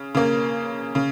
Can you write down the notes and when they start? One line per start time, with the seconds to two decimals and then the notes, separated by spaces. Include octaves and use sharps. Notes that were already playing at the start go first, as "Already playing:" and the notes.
Already playing: C#3
0.15 C#3 A#3
0.95 C#3